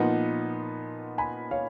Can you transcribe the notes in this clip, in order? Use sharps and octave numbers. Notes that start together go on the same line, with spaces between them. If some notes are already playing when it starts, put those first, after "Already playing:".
Already playing: A#2 F3 B3 D#4 F#5
G#5 B5
C#5 F5